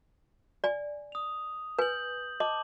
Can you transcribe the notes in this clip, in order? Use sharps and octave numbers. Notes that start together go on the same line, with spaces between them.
D5 G#5
D#6 F7
B4 G#5 G6 F#7
D#5 A5 D6 F#7